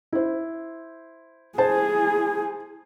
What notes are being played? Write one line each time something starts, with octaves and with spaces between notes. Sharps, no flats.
E4 C5
E4 G#4 C5 A5